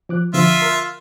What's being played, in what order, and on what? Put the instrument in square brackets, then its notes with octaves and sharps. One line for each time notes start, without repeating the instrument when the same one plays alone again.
[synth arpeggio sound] F3 D6 F#6
[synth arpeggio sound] D3 F3 [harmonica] F4 E5
[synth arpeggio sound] A#4 F#6